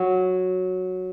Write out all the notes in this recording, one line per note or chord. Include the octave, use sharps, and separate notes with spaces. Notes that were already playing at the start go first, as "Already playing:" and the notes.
Already playing: F#3